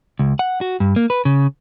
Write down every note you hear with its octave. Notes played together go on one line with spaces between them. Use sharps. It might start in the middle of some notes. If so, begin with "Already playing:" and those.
C#2
F#5
F#4
G2
A#3
B4
C#3